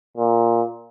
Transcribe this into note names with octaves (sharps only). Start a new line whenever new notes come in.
A#2